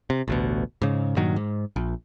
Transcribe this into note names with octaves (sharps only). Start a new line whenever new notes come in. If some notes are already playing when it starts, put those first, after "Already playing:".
C3
A1 D2 B2
G#2 C#3
G2 A#2 D#3 F#3
G#2
A#1